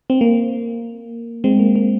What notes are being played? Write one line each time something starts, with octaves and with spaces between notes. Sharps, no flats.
C4
A#3
G#3 C4
A#3
A#3